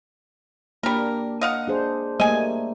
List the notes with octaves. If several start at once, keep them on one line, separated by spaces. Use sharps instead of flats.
G3 A#3 D4 A#4
D#5 F5 F#5
D4 G#4 C5
G3 A3 A#3 D#5 G#5